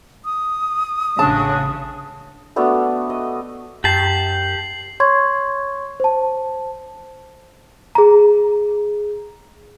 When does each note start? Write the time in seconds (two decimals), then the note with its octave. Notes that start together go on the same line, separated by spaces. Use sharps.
0.25 D#6
1.19 A1 C#3 C#4 D4 F#4 A5
2.56 A3 B3 D4 F#4
3.10 D#5
3.84 F#2 G4 A5 C7 F#7
5.00 C#5 C6 C#6 G#6
6.00 C5 A5
7.95 G#4 A#5